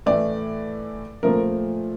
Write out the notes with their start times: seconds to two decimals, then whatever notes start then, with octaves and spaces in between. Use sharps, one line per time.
0.06 A2 E3 A3 D5
1.23 A#2 F3 A3 A#4